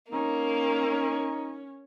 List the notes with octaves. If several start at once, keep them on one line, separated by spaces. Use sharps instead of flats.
A#3 C#4 D#4